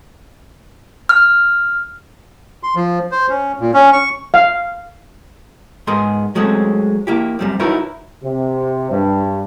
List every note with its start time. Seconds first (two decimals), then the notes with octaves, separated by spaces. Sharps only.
1.09 F6
2.63 C6
2.75 F3
3.11 C5
3.29 C#4
3.60 A#2
3.74 C#4
3.93 C#6
4.34 F5
5.87 G#2 B3 G#4 A#4 C6
6.35 F#3 G#3 A3 C4 C#4
7.07 A#3 E4 G4
7.39 F#2 G3 C4
7.59 D#4 E4 F#4 A#4 B4 C#5
8.23 C3
8.90 G2